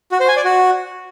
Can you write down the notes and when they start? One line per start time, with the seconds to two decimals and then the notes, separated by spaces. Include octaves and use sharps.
0.12 F#4
0.20 C5
0.28 G#5
0.36 D5
0.45 F#4